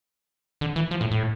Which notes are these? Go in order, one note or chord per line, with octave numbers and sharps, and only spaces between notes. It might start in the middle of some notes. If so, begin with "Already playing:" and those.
D3
E3
F3
A2
A2